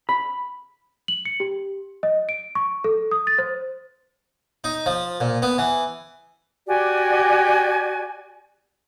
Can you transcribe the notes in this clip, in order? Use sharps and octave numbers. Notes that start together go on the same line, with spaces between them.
B5
F#7
C#7
G4
D#5
D7
C#6
A4
D#6
A6
C5
D#4
F3
A#2
B3
E3
F#4 G4 D5 G#5